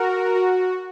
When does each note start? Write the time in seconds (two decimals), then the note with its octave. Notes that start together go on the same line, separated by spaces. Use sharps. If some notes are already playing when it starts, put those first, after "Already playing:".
Already playing: F#4 A#4
0.35 F#4